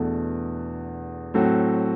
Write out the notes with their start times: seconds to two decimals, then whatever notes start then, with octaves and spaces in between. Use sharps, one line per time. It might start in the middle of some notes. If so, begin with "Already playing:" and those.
Already playing: E2 B2 A3 D4 A4
1.34 A2 F#3 C4 F#4 A4